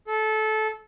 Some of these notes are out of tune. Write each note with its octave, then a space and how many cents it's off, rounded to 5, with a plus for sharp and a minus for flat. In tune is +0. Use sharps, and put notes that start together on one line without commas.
A4 -20